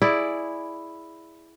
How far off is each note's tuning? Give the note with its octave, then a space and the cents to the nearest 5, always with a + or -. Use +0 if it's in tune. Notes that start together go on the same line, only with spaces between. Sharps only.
E4 +0 G#4 +0 D5 +0